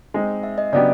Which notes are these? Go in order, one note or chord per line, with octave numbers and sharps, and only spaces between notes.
G#3 C4 D#4
E5
D#5
C#3 F#3 B3 D4 G4 D5